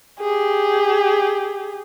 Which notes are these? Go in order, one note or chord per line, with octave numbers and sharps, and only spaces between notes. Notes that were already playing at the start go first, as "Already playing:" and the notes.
G4 G#4